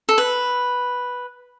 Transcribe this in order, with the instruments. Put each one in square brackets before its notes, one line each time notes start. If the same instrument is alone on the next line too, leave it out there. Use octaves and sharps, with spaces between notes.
[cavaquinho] A4
B4